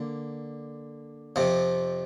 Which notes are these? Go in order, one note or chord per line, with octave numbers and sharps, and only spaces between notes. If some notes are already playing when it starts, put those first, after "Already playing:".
Already playing: D3 A#3
F2 C3 F3